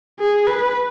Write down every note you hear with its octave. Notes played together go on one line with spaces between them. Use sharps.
G#4
B4